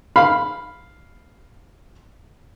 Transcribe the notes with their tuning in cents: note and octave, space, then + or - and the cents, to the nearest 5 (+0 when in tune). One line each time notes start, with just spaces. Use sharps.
F5 +0 B5 +0